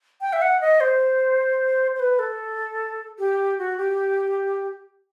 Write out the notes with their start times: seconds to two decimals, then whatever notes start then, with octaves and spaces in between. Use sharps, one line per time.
0.21 G5
0.33 E5
0.42 F#5
0.61 D#5
0.80 C5
1.95 C5
2.00 B4
2.19 A4
3.19 G4
3.59 F#4
3.78 G4